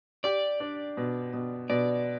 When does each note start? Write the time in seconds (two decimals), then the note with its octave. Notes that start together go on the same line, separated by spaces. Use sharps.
0.24 G4 D5
0.60 D4
0.97 B2
1.33 B2
1.70 B2 D5